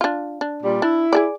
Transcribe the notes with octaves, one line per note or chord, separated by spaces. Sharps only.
D4 F4
D4
A#2 G3
D4 E4
G#4 A4 D5